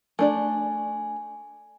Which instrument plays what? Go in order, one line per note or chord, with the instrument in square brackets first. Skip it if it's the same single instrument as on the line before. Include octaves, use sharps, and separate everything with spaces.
[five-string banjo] A3 D4 D5 [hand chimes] G#5